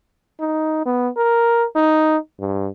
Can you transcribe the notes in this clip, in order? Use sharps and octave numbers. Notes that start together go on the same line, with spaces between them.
D#4
B3
A#4
D#4
G2